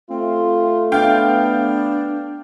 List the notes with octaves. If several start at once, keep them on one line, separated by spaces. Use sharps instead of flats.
A3 C4 F4
B3 D4 F5 G5